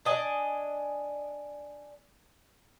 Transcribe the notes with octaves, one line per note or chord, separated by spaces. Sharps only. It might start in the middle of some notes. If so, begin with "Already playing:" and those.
D4 D#5 G#5